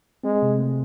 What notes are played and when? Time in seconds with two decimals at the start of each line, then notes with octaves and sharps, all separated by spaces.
0.24 G#3 C4
0.42 C3
0.59 A3